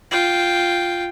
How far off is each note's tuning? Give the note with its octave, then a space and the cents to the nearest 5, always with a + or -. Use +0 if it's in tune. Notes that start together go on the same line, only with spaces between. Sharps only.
F4 +0 G5 +0